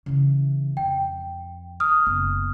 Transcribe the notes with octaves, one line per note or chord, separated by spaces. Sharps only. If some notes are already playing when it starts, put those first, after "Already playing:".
C#3 E3
F2 G5
D#6 F6
F#1 B3